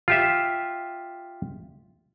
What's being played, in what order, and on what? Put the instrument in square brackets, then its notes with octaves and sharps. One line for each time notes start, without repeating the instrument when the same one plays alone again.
[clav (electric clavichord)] F4 G4 E5